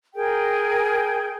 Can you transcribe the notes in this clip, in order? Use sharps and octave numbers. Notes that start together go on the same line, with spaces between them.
G#4 A#4 G5